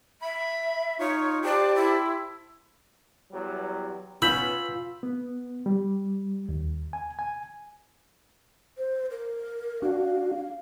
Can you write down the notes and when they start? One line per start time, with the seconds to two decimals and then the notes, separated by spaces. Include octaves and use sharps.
0.22 E5 B5
0.99 D#4 F4 C#5 C#6
1.44 G4 C5 D5 A5
1.75 E4
3.32 E2 F#3 G3
4.22 B3 C#4 F4 B5 E6 G6 B6
5.03 B3
5.66 G3
6.49 D#2
6.93 G#5
7.19 G#5
8.78 C5
9.11 A#4
9.82 D4 F#4 F5